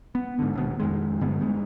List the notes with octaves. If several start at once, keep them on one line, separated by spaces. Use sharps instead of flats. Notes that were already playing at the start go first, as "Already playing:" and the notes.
B3
G#2 D3
D#1 D#2 B2
F2 D#3 G#3
G2 D3 G#3 B3
G2 G#3